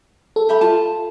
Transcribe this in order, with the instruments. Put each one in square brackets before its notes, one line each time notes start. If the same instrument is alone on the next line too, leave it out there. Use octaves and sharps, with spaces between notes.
[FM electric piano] A4
[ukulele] G4 E5 B5
F4 A5